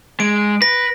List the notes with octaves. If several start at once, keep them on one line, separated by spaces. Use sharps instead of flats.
G#3 D7
B4 A#6